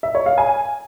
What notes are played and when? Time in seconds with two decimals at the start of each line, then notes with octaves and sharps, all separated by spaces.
0.03 E5
0.15 C#5
0.26 F5
0.38 G#5